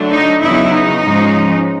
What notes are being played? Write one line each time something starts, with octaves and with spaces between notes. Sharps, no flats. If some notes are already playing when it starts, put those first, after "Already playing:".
Already playing: D3 F#3 A3 D4
D#4
E2 C#3 F#3 B3 D#4 E4
D#4
G#2 F3 G#3 C#4